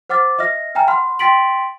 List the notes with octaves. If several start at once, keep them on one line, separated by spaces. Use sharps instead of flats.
C5 F#5 D6 F6 A6
D#5 E5 F6 A#6
E5 G5 G#5 A#5 F6
F#5 B5 C6 F6
G5 C6 A6 B6 D7 F#7